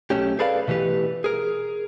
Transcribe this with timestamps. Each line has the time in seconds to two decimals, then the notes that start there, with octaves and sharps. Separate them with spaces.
0.10 B1 F2 A3 C#4 G4
0.39 G#4 A4 B4 D5 E5 F5
0.68 B2 E3 A3 G4 B4
1.24 G#4 A#4